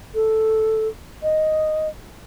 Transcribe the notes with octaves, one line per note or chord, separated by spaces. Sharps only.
A4
D#5